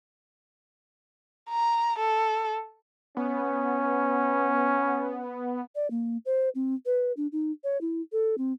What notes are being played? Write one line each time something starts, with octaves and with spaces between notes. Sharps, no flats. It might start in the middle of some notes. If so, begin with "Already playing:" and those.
A#5
A4
B3 C#4
D5
A#3
C5
C4
B4
D4
D#4
C#5
E4
A4
C4